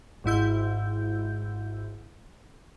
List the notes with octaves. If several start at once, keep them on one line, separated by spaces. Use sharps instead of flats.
G#1 G#2 E4 G6